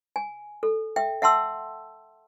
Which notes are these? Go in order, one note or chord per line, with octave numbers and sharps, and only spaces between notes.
G#5
A4
E5 G5
E5 F#5 A5 C6 E6